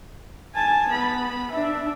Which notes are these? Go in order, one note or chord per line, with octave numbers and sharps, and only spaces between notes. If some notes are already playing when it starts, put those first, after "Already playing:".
G#5 A5
B3 B5
D4 E5